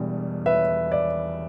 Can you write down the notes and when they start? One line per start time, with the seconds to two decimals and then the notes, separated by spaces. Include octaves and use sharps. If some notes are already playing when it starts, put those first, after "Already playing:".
Already playing: E1 E2 B2 G3 D4
0.46 B4 E5
0.92 D5